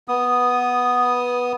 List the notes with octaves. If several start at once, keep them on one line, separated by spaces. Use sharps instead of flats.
B3 D#6